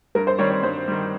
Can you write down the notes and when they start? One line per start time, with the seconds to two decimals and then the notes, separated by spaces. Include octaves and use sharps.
0.15 G2 A#4
0.27 C5
0.38 D#3 G3 C#5
0.51 C#5
0.63 G2 C5
0.88 D#3 G3